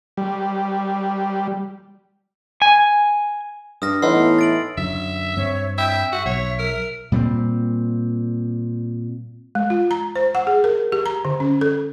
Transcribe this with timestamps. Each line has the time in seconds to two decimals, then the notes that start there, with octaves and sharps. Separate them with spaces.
0.17 G3
2.62 G#5
3.82 G2 D#6 F6 A#6
4.02 A2 E3 B3 D#4 C6 E6 C7
4.39 A6 D7 F#7
4.77 F#2 D3 F#3 E5
5.37 G2 C4 C#5
5.78 E5 G5
6.12 F#4 E5
6.26 B1 C#5
6.59 A#4
7.12 A#2 G3 G#3 C4
9.55 G#3
9.70 F4
9.91 A#5
10.16 C5
10.35 F#5
10.47 G#4
10.64 A#4
10.92 G4
11.06 A#5
11.25 D3
11.40 C#4
11.61 A4